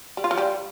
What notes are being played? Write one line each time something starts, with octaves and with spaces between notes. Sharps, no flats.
G3
F4
F3
G3